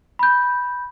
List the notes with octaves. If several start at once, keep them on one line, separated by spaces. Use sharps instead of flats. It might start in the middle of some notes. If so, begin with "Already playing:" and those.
B5 G6